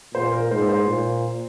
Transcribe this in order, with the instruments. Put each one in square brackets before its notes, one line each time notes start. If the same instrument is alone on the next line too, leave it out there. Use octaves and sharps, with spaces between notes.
[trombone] A#2 [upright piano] C5
[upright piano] A#4
[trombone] G#2 [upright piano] C5
[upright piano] C5
[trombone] A#2